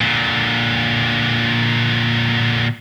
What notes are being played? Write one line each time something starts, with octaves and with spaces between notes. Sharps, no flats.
A#2 D3